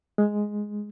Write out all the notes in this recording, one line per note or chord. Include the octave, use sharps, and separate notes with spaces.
G#3